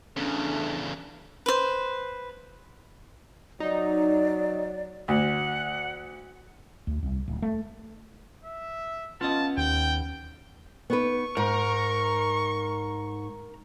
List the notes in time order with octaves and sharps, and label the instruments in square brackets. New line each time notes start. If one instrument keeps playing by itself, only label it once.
[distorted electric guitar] E2 C#3 [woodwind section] A3 C#4 D4
[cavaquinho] B4 C5
[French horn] F#3 [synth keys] D#4 [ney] D5
[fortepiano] D2 [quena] F#5
[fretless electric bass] D2
C2
D1
A3
[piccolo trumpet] E5
[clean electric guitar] B3 C#4 D#5 [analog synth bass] F4 [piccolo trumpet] A5
[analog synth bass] D#2 [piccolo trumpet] G5
[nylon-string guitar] B3 D#4 B4 [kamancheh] C#6
[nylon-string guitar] G#2 [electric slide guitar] A#4 A#5